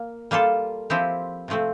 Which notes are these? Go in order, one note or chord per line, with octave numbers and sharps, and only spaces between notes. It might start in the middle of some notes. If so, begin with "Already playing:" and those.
Already playing: A#3
G3 A#3 F4 A4
F3 C4 E4 G4
C3 F3 A3 C4